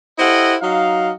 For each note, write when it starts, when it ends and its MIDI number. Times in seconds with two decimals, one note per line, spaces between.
0.19 0.55 64
0.19 0.55 67
0.19 0.55 69
0.19 0.55 72
0.19 0.55 75
0.19 0.55 78
0.62 1.12 54
0.62 1.12 63
0.62 1.12 75
0.62 1.12 77